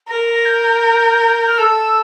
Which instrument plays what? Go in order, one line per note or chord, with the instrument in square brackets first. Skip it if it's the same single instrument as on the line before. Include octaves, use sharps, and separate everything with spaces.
[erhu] A#4 [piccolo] A#6
[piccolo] G6
F6
[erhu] A4 [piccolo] E6